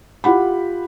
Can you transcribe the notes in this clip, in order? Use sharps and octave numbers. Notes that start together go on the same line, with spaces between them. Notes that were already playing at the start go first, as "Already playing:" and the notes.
F4 G4 F#5 B5